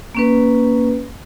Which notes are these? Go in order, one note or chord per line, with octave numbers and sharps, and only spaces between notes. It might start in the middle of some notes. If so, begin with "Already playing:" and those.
A#3 C#4 B4